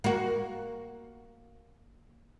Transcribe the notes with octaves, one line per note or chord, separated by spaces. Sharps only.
A#3 F#4